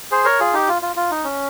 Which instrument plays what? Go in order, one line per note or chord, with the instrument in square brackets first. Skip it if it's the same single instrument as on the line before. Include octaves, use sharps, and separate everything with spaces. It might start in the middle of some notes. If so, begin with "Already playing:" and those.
[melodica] G#4 C5
A#4 C#5
F4 G#4
D#4 G4
F4
F4
F4
D#4
C#4